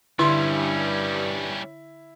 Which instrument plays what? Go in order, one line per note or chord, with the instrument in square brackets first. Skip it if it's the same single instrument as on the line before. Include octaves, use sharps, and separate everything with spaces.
[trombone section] G2 [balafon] D3 C6 [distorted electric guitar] G3 C#4 [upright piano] E4